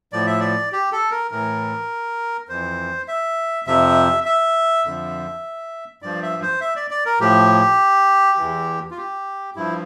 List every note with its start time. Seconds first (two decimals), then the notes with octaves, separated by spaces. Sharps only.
0.13 A2 F3 D5
0.27 E5
0.40 D5
0.72 G4
0.92 A4
1.11 A#4
1.31 A2 E3 A#4
2.49 F2 E3 C5
3.08 E5
3.67 F2 C3 F3 E5
4.26 E5
4.85 F2 D3 F3
6.02 G2 F3 D5
6.22 E5
6.42 C5
6.61 E5
6.76 D5
6.91 D5
7.06 A#4
7.20 A2 F3 G4
8.38 E2 E3
8.91 F4
8.97 G4
9.56 G2 F3 E4